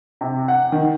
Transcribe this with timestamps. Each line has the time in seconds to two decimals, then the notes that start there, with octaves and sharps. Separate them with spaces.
0.21 C3
0.48 F#5
0.72 D#3